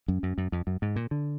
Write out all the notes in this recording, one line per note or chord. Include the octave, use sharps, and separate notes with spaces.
F#2
F#2
F#2
F2
F#2
G#2
A#2
D3